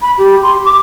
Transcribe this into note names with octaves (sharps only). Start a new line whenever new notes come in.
B5
G4
C6
D6